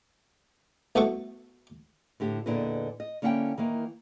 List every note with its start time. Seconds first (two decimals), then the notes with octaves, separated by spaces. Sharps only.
0.95 C2 B2 A3 F#4 A4 C#6
2.20 A2 D3 G4
2.46 E2 A#2 D3 E4 B4 D#5
3.00 D#5
3.22 D3 A#3 C#4 E4 F#5 G5
3.58 D#3 E3 A#3